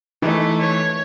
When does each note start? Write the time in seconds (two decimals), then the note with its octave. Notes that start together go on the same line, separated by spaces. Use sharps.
0.22 E3 A3 D#4
0.61 C#5